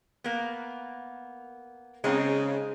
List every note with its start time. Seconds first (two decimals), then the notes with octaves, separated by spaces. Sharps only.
0.24 A#3 B3
2.04 C#3 G#3 C4 D#4